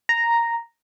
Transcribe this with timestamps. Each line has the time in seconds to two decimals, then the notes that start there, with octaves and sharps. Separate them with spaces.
0.09 A#5